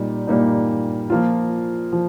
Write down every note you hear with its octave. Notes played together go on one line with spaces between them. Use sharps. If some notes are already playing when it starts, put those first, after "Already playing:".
Already playing: A#2 G3 D#4
A#2 G3 A#3 D#4
F3 A#3 F4
F3